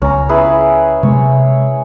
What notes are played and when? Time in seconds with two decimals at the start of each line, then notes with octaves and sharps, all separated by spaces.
0.02 C#2 C#4 A#5
0.29 E4 G#4 B4
1.03 C3 G#3 C#5